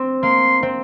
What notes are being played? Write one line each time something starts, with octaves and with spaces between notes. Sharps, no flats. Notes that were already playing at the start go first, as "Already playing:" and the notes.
Already playing: C4
A#3 C6
C4